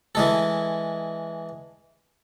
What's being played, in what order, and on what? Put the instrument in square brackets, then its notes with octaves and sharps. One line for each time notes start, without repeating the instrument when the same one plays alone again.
[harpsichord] E3 G#3 A4